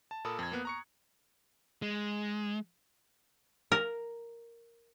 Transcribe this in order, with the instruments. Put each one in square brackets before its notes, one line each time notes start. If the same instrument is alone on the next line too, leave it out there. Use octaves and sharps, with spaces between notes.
[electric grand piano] A5
A#2 A4 A#4 A5 B5 D#6
F2 G#6
A#3 B3 F#6
A#5 C#6 C#7
[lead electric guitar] G#3
[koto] A#4